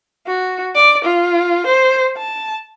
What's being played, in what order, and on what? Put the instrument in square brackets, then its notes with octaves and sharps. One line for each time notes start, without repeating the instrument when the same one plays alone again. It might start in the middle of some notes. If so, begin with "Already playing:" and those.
[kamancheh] F#4
D5
F4
C5
A5